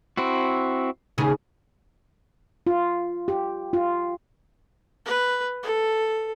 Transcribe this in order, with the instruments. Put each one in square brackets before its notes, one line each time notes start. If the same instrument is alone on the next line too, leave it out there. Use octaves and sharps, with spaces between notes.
[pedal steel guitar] C4 E4 F#4
[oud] D#2 C#3 G#4
[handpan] F4
G4
F4
[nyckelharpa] B4
A4